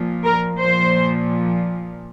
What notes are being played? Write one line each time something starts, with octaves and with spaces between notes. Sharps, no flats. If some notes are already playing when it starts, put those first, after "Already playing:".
Already playing: A#2 F3
A#4
A#2 F3 C5